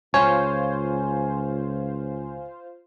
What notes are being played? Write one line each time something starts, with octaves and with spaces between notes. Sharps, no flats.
C#2 F4 C5 C#5 F5 G#5